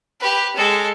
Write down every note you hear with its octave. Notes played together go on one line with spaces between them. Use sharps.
G4 B4
G#3 A4